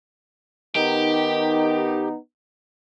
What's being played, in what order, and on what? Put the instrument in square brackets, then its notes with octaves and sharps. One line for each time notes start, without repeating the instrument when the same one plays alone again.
[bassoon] D#3 [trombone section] B3 D#4 [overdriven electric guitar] G4